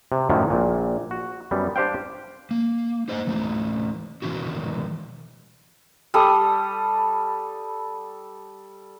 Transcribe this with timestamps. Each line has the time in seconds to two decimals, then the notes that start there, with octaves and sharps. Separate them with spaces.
0.12 C3
0.29 F#2 A2 D3 D#3 F3 F#3
0.50 A#1 A#2
1.11 F#4
1.51 F#2 G3 B3
1.76 D4 G4 C5 F5 G5
2.51 A#3
3.08 D#4 C5 D#5 F#5
3.27 E3 A3 D#4
4.22 B2 D#3 E3 C4 E4 F#4
6.14 G3 A4 D#6